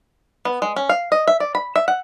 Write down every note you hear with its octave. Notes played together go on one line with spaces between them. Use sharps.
B3
G#3
C#4
F5
D#5
E5
D5
B5
E5
F#5